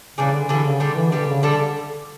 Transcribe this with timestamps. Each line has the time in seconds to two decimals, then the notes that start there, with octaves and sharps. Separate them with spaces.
0.18 C#3 E3 G3 D4
0.33 D3
0.49 D3 E3 G3 D4
0.65 C#3
0.80 D3 G3 D4 G4
0.96 E3
1.12 D3 G3 D4 G4
1.28 C#3
1.43 D3 G3 D4 A4